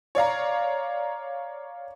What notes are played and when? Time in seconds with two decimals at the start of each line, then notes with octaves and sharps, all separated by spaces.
0.15 C#5 D5 F5 A#5